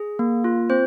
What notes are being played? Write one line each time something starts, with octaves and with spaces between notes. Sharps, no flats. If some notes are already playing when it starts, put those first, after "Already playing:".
Already playing: G#4
A#3
F4
C4 C5